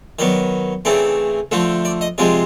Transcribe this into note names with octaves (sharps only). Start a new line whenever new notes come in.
D#3 F#3 B3 D5
C#3 E3 A3 C4 D5
D3 F3 A3 C4
D5
D#5
C3 F3 G#3 C4 D5